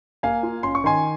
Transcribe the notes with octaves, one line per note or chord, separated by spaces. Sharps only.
A#3 F5 G#5
F4
C#4 C6
C#6
D#3 G#5 C6